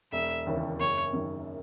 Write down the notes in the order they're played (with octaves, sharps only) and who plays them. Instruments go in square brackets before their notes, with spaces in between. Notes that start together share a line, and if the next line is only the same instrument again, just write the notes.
[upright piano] E1 [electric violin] E5
[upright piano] D#2 C#3 E3
[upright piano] F#1 [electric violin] C#5
[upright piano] F#2 D#3